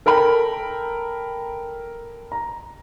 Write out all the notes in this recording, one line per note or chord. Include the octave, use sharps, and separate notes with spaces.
A4 A#4 G5 B5
A#5